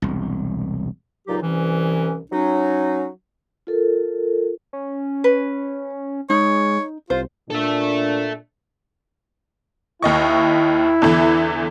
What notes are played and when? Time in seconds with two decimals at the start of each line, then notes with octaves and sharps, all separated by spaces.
0.02 E1 C2
1.27 C#2 A#2 F#3 D#4 F4 G4
1.42 C2 E3 C#4
2.31 F#3 C#4 D#4
3.67 F4 A4 A#4
4.73 C#4
5.24 B4
6.30 G#3 D#4 C#5
7.10 C2 F4 C5
7.50 A#2 D4 A4 E5
10.02 D#2 E4 D#5 C#6
11.02 E2 D3 E3